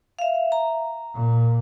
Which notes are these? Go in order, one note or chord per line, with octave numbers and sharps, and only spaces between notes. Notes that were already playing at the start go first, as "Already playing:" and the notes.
E5 F5
A#5
A#2